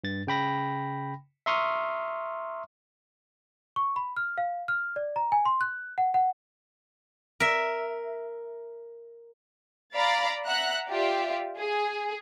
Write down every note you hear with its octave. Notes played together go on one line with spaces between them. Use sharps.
G2 A6
C#3 G5 B5 A#6
E5 A#5 C6 C#6 D#6 F6
C#6
B5
F6
F5
F6
D5
A#5
G#5
C6
F#6
F#5
F#5
A#4 E5
D5 F5 A#5 B5 A6
E5 F#5 A#5 F#6
F4 G4 D5 E5
G#4